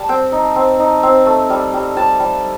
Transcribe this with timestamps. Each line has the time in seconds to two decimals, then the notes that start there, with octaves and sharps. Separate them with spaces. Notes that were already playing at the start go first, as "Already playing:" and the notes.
Already playing: G3 A5
0.09 C4 G5
0.32 D#4
0.56 C4
0.79 D#4
1.03 C4
1.26 A3
1.50 G3
1.74 G3
1.96 G3 A5
2.20 G3